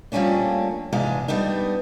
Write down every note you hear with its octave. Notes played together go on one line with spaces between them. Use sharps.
F3 G3 A3 A#3 C#4 D4
E2 G#2 C3 G#3 D4 F5
G3 B3 D4 D#4